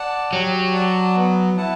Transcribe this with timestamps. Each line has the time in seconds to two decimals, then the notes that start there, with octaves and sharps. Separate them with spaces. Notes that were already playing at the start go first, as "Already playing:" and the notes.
Already playing: D5 F#5 A5
0.32 F#3 G4
0.74 D5 F#5 A5
1.15 B3
1.57 E4 B4 F#5 A5